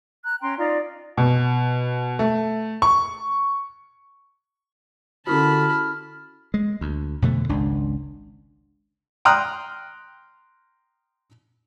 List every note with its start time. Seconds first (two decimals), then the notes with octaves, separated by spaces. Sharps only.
0.25 A#5 F#6
0.41 C#4 G5 A#5 C6
0.58 D#4 F4 D5 A#5
1.17 B2
2.19 A3
2.82 C#6
5.27 D3 C#4 E4 F#4 A5 B5 F6
6.54 G#3
6.81 D2
7.22 F2 B2 D3 A3
7.49 G#1 C#2 C#3 D4
9.25 G5 A#5 C6 D#6 F6 F#6